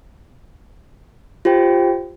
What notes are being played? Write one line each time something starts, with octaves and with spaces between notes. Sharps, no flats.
F4 G4 C5 G5